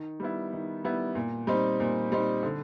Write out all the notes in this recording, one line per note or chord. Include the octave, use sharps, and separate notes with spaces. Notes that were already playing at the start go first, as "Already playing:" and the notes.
Already playing: D#3
G3 B3 E4
D#3
G3 B3 E4
A#2
G3 C4 D#4
A#2
G3 C4 D#4
D3